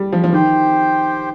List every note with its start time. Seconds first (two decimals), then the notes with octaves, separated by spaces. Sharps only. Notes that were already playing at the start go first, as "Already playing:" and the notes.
Already playing: G3
0.12 F3
0.24 F3
0.32 D#3 G4 C5 G5